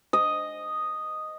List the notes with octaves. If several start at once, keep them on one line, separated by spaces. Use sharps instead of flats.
D#5